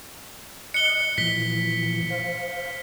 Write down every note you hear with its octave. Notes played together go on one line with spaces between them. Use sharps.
D#5 F#6 C#7 G7
A#2 E3 F3 B6 G7
C5 F5